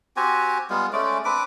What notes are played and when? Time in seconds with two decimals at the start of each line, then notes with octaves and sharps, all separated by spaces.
0.17 C4 F#4 G4 G#5
0.70 G3 G#3 B3 F4
0.93 G#3 A3 C#4 D5
1.25 C4 D4 B4 D6